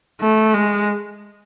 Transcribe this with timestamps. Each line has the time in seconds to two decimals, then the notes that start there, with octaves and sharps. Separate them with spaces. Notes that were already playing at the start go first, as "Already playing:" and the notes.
0.21 A3
0.54 G#3